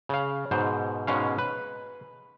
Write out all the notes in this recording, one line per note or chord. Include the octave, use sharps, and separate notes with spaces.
C#3 F5
G#2 B2 C5
G#2 B2 G#3 C#4 F5
B4